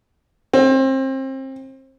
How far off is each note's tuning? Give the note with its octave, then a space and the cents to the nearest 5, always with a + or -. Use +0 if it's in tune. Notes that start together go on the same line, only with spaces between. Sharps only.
C4 +30